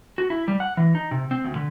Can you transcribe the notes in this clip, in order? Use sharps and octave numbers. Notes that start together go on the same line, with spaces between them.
F#4
E4
G3
F#5
E3
D#4
C3
C4
D2
D3